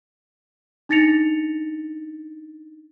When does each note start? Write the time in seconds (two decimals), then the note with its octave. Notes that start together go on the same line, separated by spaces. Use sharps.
0.89 D4 D#4 A6 A#6 C#7 F7